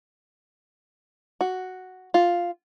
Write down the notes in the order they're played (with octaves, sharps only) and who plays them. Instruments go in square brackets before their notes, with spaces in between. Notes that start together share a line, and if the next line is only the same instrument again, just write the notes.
[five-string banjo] F#4
F4